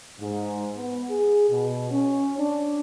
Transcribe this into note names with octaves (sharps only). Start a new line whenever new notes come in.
G#2
B3
G#4
B2
C#4
D4